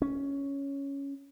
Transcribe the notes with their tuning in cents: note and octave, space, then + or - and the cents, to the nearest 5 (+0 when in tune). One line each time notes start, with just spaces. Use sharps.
C#4 +5